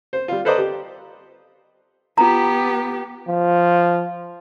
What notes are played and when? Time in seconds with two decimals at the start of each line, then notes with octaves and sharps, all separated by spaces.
0.13 C5
0.28 G3 F4
0.45 A4 B4 C5 D5 D#5 A#5
0.58 G4
2.18 B3 F4 G4 A#5
3.28 F3